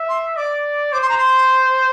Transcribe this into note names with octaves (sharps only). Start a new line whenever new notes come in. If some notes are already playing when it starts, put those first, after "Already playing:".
Already playing: E5
C6
D5 D6
C5 D6
C6
A#5
C6